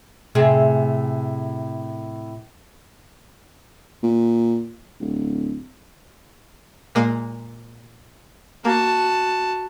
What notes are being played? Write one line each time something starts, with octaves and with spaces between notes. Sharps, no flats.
A2 C3 G#4
A#2
D1
A#2 G#3 A#3
A#3 F#4 A5